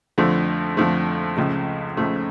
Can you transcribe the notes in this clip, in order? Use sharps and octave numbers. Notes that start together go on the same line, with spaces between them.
F2 D3 F3 A3
F2 D3 F3 A3
C#2 C#3 F3 A3
C#2 C#3 F3 A3